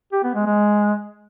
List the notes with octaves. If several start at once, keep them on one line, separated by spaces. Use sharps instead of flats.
G4
B3
G#3
G#3